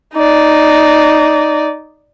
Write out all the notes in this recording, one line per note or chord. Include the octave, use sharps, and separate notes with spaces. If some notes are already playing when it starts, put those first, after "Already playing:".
D#4 D5